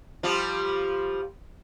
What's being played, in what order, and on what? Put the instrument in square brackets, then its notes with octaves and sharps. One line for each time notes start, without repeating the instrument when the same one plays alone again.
[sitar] F3 G3 F4